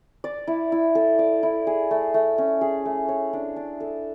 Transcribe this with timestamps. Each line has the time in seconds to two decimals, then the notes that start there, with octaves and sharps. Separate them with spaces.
0.24 D5
0.47 E4
0.72 E4
0.95 A4
1.19 D5
1.43 E4
1.67 G#4
1.91 A3
2.14 A3
2.38 C#4
2.61 G#4
2.85 A3
3.09 C#5
3.33 D4
3.56 D4
3.80 A4